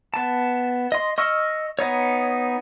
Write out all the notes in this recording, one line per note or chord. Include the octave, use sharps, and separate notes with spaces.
B3 A5
D#5 C6
D#5 C#6 E6 F6
B3 D#4 C#5